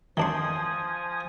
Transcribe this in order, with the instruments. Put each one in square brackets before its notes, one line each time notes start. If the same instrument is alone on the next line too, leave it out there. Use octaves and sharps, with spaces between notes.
[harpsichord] D#3 D4 C6 [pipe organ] F3 G#5 D#6